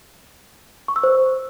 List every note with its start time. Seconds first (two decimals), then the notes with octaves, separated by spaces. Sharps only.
0.88 C#6
0.96 E6
1.03 C5